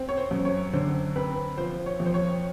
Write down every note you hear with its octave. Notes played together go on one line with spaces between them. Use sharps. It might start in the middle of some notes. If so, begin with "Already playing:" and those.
Already playing: C4
C#5
C5
F#2
C#5
D3 C5
C4 B4
F3 C5
C#5
F2
C5
C#5